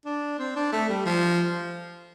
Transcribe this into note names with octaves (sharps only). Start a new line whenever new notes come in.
D4
C4
D4
A3
G3
F3